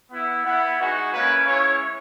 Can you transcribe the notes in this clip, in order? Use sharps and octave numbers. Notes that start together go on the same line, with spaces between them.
B3 E4
B3 E4
G#3 D#4 F#4
A#3 C#4 E4 B4
G#3 C#4 E4 C#5